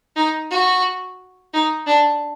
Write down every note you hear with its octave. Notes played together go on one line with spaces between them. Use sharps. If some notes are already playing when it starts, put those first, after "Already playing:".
D#4
F#4
D#4
D4